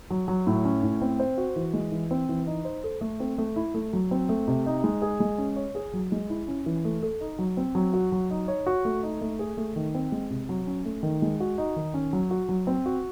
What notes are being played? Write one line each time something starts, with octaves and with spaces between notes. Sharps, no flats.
F#3
F#3
A2
C#4
A2
C4
C5
F#4
E3
G#3
E3
C4
E3
D#4
C5
A4
A3
C4
A3
E4
A3
F#3
C4
A3
C3
D#4
G#3
G#4
G#3
C#4
C#5
G#4
F#3
G#3
E4
C#4
E3
A3
A4
D#4
F#3
C4
F#3
F#4
F#3
D#4
C#5
F#4
A3
D#4
A3
G#4
A3
D#3
C4
G#3
C3
F#3
C#4
A3
D#3
G#3
F#4
D#4
D#3
C#4
F#3
F#4
F#3
C4
F#4